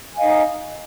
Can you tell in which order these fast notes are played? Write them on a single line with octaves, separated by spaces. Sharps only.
G#5 F5 D#5 D#4